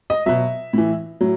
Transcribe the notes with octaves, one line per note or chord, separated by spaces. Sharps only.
D#5
B2 F#3 E5
A2 E3
A2 F#3